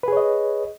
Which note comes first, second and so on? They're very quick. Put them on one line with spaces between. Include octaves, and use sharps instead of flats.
B4 G#4 C#5 D#5